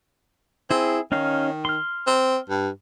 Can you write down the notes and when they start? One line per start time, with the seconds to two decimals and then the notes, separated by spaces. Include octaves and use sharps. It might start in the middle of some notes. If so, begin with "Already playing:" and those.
0.71 C4 E4 G#4
1.12 D#3 C#4 D#4 F5
1.65 C6 F6
2.07 C4
2.50 G2